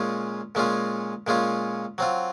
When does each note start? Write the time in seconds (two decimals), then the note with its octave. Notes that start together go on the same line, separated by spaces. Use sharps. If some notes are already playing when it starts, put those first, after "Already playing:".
Already playing: A#2 G#3 C#4 F4
0.55 A#2 G#3 C#4 F4
1.27 A#2 G#3 C#4 F4
1.98 F#3 C4 F4